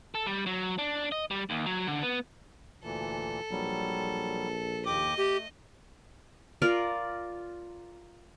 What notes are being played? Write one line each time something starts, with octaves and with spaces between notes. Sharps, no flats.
A4
G3
F#3
D4
D#5
G3
D#2
F#3
D3
B3
D2 A#2 E3 A4
A#1 F#3 G3
D#2 G4 D#5 D6
A3 G4
F4 A#4 D5